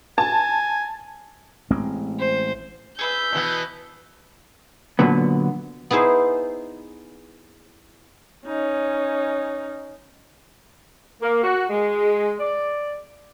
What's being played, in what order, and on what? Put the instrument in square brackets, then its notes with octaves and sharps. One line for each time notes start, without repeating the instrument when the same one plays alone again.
[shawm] G#5 [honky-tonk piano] A5
[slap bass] A1 G#3 C4
[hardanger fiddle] C5
[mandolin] G#4 B4 E5 [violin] G6
[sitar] B2 E3 B3
[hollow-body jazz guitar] A#2 D3 F#3 B3
[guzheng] B3 D#4 E4 G#4 C5
[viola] C#4 D#4
[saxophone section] A#3
F#4
G#3
D5